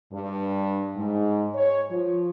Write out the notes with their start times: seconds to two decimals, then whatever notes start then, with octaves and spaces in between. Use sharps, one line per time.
0.13 G2
0.96 G#2
1.55 C#5
1.90 F3